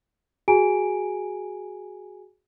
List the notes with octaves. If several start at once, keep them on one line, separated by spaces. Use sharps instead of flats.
F#4 G#4 G#5 A#5 D7